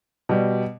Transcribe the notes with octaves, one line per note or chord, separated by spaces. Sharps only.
B2 G3